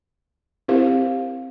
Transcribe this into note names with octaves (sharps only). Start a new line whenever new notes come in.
C4 E4 G4 A#4 C5 F5